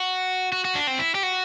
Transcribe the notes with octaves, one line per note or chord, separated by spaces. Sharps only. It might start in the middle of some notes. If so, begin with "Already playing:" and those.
Already playing: F#4
F#4
F#4
D4
C4
E4
G4
F#4